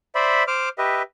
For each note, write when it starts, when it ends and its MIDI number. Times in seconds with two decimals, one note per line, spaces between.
0.15 0.44 72
0.15 0.44 74
0.15 0.44 76
0.15 0.44 83
0.48 0.69 72
0.48 0.69 86
0.48 0.69 89
0.78 1.02 67
0.78 1.02 71
0.78 1.02 75
0.78 1.02 76